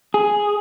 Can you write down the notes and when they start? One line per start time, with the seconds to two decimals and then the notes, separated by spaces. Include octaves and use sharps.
0.14 G#4